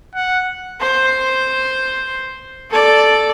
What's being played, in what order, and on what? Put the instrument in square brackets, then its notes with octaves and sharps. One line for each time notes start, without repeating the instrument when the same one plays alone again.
[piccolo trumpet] F#5
[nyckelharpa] C5
A4 D5